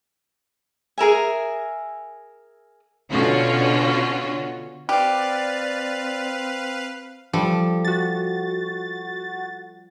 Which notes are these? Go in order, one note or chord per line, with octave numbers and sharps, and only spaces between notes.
G#4 A#4 E5 G#5
B2 D3 C#4 F4 F#4
C4 G4 B4 D5 F5
F3 G3 A4
F#4 A6